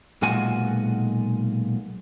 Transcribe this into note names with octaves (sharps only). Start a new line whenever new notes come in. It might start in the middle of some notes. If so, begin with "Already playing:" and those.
B1 A#2 G#3 F4 F#4 G#5